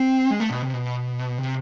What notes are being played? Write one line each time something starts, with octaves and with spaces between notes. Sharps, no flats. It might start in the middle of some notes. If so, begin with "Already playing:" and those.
Already playing: C4
G#3
A3
B2
C3
B2
C3